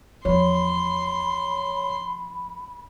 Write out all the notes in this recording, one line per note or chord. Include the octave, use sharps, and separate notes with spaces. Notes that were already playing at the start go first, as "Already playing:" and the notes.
E2 F3 C#5 B5 C6